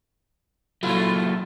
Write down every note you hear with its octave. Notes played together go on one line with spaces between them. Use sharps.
A#2 F#3 A3 E4 F4